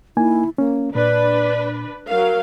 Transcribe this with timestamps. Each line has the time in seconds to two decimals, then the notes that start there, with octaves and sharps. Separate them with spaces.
0.17 A#3 D#4 E4 G#5
0.58 A#3 C#4
0.95 A#2 D4 B4 D5
2.09 F#3 A#4 F5